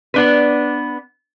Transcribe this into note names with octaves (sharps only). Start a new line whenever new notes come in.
B3 D4 B4